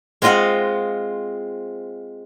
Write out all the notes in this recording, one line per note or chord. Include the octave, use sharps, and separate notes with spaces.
G#3 C4 F4 D#5 F5 F#5